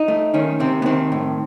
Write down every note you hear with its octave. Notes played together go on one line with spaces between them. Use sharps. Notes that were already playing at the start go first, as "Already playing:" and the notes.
Already playing: D#4
A3
D#3 C#4
C3 C4
B3
D#3 C4
A2